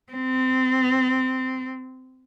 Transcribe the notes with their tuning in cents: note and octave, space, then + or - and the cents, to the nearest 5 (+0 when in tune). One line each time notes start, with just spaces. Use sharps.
C4 -20